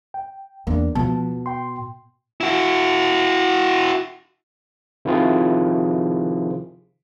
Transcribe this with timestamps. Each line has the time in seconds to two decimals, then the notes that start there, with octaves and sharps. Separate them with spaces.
0.14 G5
0.67 E2 A#3 D4
0.95 B2 F3 A5
1.46 G5 C6
2.41 E4 F#4
5.05 C3 D#3 F3 E4 F4 G#4